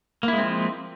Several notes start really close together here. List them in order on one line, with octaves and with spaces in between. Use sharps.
A#3 E4 G#3 C4 F3